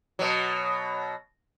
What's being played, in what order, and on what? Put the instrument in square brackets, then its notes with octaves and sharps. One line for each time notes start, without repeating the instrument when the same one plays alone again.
[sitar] B2 F#3